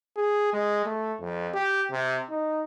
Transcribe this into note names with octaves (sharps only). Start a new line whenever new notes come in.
G#4
G#3
A3
F2
G4
C3
D#4